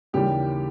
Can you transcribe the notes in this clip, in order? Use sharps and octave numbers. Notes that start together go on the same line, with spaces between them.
D#2 C#3 E3 G3 G4